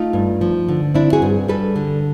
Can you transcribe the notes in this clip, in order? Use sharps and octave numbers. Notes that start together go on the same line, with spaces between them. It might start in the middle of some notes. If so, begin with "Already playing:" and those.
Already playing: A3 D#4 F4
G2
F3
D3
C4 D4 E4
F#4 G#4
G2
G3 A4 B4
D3